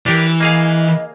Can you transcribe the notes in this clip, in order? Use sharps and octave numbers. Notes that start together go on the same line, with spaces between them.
E3 D4 G4 A#4
A#3 G#4 D#5 F5